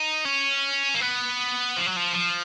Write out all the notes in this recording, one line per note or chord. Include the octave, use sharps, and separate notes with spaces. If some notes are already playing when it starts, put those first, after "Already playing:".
Already playing: D#4
C#4
A#3
B3
F3
F#3
F3
F3